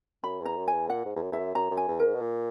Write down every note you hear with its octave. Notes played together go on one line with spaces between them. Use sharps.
F#2 B5
E2
A#5
F#2
G#5
E2
A#2 F#5
G#2
E2
F#2
E2 E5
F#2
F#2 A#5
F#2
G#5
E2
A#4
G#2
B2
A#2